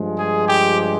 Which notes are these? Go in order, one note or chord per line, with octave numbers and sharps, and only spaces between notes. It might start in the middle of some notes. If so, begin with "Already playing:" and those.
Already playing: G2 F3 G#3
G#4
G4